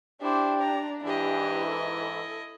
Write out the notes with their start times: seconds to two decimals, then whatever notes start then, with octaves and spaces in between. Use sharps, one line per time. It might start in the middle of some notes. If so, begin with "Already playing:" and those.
0.22 D4 E4 G4 C5
0.61 A#5
1.03 G#2 E3 D4 E4 G4 D#5
1.68 A4